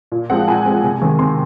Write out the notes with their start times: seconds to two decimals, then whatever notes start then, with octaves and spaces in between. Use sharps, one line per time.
0.12 A#2
0.30 F3 G#3 C4 F#5
0.47 A#2 G#5
0.65 F3 G#3 C4
0.84 C3
1.02 D#3 G#3 C4
1.19 C3 C6